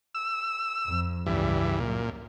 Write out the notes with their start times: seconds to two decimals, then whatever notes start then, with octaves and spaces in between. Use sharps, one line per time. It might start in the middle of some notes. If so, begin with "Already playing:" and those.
0.15 E6
0.87 F2
1.26 C#2 G2 C#3 E3 G3
1.80 F#2 A#2